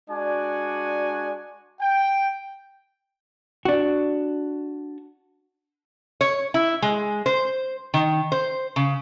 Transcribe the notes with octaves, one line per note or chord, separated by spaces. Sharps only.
G#3 D4 F#4 D5 G#5
G5
D4 F#4
C#5
E4
G#3
C5
D#3
C5
C#3